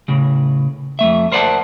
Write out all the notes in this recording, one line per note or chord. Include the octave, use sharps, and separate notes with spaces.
A2 C#3
F2 A3 E5
A#4 C5 D5 D#5 F#5 A5